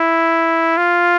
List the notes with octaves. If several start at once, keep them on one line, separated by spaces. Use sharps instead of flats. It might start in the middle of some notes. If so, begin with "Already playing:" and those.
Already playing: E4
F4